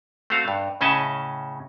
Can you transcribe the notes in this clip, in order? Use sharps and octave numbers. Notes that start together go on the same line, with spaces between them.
A3 C4 F#4 F5
G2
A2 C#3 C#4 D#5 E5 A5